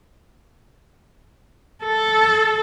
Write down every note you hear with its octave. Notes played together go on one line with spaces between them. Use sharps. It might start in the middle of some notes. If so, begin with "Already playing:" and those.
A4